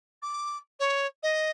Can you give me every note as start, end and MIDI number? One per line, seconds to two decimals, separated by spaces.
0.22 0.57 86
0.79 1.06 73
1.23 1.50 75